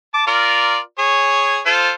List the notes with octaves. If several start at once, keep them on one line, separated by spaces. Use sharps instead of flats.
A5 D6
F4 A#4 D5
G#4 C#5
F4 A4 C5